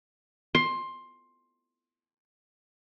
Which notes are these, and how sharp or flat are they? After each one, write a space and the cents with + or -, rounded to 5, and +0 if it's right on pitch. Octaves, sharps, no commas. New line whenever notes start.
C6 +15